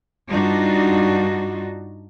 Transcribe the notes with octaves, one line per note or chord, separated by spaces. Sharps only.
G2 D4 D#4 F4 F#4